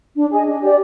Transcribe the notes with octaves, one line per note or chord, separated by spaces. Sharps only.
D4
G#4 D#5 G#5
D4
G4 D5